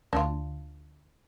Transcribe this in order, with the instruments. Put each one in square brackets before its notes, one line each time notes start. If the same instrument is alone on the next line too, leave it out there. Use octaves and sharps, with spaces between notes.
[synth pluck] D2 D3 [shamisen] D4 F4